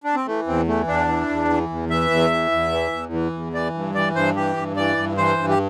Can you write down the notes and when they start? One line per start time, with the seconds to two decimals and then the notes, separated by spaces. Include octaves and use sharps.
0.04 D4
0.15 C4
0.26 E3 A3
0.47 E2 C4
0.68 E3 A3
0.87 E2 D4
1.09 E3
1.29 E2
1.49 E3
1.70 E2
1.90 E3 E5
2.11 E2
2.31 E3
2.51 E2
2.72 E3
2.92 E2
3.13 E3
3.33 E2
3.54 E3 D5
3.74 G2
3.94 E3 D5
4.15 G2 C5
4.36 E3 G4
4.56 G2
4.76 E3 D5
4.97 G2
5.17 E3 C5
5.38 G2
5.49 G4